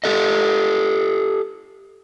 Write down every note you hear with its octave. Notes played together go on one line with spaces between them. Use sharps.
G4 A4 D#5